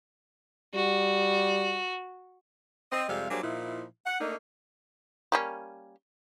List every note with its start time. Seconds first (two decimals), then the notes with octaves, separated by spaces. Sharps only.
0.74 G3 F#4
2.92 C4 D#5
3.09 F2 C3 G3 G#3 F5
3.30 F#3 G3 A#3 D4 G#4 C5
3.42 A#2 F3 D#4 E4
4.06 F#5
4.20 A3 A#3 D4 D#4
5.32 G3 A#3 C#4